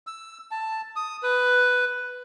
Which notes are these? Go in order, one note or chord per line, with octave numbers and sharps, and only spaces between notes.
E6
A5
D#6
B4